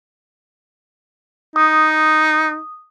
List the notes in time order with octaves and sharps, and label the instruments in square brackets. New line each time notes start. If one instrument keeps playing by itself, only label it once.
[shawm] D#4 [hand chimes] D#6